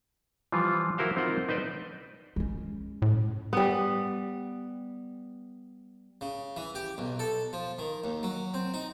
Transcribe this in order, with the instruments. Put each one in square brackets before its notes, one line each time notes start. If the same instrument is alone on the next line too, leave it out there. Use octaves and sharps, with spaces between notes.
[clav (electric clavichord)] E3 F3 G3 F4
E4 F#4 A#4 C5 F5
C4 D#4 F4 A#4 D#5 F#5
D#4 B4 C5 D5
[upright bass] G#3 C#4
[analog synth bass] A2
[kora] G3 B3
[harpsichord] C#3
E3
G4
B1
A4
F3
D#3
D#2
F#3
C4
D#4